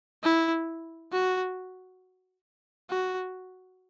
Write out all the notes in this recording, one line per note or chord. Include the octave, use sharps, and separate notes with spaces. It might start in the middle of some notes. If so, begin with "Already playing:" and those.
E4
F#4
F#4